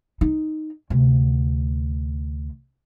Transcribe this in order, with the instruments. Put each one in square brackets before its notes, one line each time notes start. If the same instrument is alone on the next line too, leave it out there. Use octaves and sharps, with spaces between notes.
[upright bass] D#4
D2 C3